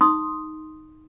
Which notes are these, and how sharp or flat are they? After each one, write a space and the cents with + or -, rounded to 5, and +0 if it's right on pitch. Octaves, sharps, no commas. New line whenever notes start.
D#4 +0 C6 +0 D#6 +0